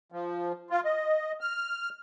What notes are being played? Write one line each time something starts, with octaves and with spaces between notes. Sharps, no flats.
F3
F4
D#5
F6